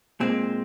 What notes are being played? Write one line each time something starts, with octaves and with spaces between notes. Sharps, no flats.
A#2 G#3 C4